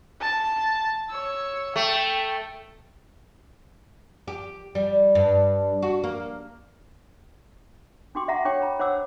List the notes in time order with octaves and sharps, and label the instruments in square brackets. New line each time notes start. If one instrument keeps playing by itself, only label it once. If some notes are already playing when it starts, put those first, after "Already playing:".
[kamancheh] A5
C#5 E6
[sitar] A3 [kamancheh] G5
[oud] G4
G3
G2
F#4
A#3
[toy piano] D4 F#4 G4 G5 C6 D6
E5 F#5 A#5
D4 G4 C#5 G5 D6
A#5 B5
D4 C5 C#5 F#5 D6 E6